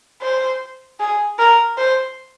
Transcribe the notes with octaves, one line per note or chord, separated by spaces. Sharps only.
C5
G#4
A#4
C5